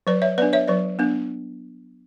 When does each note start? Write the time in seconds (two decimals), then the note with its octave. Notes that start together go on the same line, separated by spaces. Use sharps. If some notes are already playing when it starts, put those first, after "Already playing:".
0.07 F#3 B4 D5
0.22 C#5 E5
0.38 B3 D4 B4 D5
0.53 C#5 E5
0.68 F#3 B4 D5
0.99 B3 D4